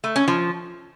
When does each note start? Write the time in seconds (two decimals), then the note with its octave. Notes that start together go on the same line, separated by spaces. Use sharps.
0.04 A3
0.16 C#4
0.28 F3